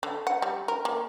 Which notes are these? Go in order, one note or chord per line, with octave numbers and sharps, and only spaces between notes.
D3
F#5
G3
A#4
A#3